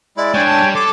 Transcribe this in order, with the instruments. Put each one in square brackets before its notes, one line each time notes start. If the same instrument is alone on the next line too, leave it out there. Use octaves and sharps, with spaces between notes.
[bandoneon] G#3 E4 [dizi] D5
[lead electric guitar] G#3 D4 [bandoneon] C#5 G5 G#5
[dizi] A5
[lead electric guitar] G3
[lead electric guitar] A4 [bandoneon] A5 C6 [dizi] D6